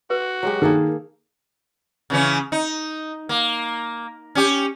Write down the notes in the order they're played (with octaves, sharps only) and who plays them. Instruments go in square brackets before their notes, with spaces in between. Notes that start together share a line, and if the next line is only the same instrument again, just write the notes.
[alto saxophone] F#4 [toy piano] B4
[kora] F#3 G#3 G4
[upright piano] D#3 [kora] A#3 G#4 A4
[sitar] C#3 E3 C#4
D#4
A#3
C#4 G4